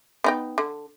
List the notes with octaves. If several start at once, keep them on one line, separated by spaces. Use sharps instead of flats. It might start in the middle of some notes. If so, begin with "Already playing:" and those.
B3 D#4 G5
D3